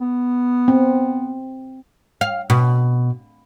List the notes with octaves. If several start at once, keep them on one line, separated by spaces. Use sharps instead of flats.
B3
C4
F5
B2